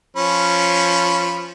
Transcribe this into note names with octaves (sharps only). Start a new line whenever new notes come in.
F3 C#4 B5